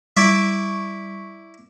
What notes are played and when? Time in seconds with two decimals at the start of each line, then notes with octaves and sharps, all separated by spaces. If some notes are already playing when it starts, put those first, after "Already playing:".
0.17 G3 E4 D5 E5 C#6